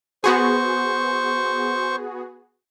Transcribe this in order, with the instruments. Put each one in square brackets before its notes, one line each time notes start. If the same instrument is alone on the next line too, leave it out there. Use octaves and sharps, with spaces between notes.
[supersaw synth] B3 F#4 G#4 [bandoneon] C5 C#6